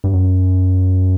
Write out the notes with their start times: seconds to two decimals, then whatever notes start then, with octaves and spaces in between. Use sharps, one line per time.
0.04 G2
0.13 F#2